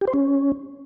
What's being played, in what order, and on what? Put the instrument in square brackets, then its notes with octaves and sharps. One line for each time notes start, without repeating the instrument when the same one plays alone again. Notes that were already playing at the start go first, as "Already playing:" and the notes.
[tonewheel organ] G4
C5
C#4